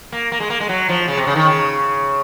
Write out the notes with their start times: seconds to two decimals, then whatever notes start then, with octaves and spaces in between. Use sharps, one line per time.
0.12 A#3
0.32 A#3
0.40 G#3
0.50 A#3
0.60 G#3
0.69 F#3
0.89 F3
1.08 C#3
1.17 C3
1.27 C#3
1.36 D#3
1.45 C#3